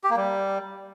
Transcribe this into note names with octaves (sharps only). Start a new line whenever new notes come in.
G4
A#3
G3